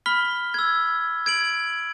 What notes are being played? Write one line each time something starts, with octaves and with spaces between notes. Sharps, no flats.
B5 F6 B6 G7
E6 G#6
G#6 D7 F#7